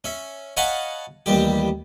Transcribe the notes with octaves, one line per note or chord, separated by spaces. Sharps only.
C#4 E5
C#5 D#5 F5 F#5 A5 B5
A1 D#2 G3 G4